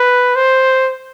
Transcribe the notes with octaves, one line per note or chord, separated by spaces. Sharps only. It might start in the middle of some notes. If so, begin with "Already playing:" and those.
Already playing: B4
C5